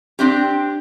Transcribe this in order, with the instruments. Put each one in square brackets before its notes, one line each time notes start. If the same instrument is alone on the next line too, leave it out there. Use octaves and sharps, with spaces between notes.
[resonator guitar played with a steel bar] C4 D4 G4